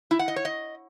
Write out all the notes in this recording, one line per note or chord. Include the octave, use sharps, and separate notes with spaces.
E4
F#5
D#5
C#5
D#5